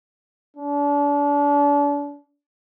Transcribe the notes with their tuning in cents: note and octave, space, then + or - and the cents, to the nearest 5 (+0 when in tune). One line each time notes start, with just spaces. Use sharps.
D4 -35